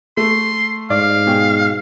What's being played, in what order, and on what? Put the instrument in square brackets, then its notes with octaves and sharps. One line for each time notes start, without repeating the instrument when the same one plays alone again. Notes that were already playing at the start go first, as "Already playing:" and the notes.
[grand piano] A3 [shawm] C6
[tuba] G#2 [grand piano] D5 [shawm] F5
[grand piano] B2 G#4 G5